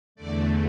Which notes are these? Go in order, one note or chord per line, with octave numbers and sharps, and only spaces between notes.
E2 D3 A3 D5